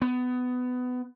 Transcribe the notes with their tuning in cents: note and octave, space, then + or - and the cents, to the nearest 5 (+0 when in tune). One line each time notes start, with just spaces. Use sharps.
B3 +20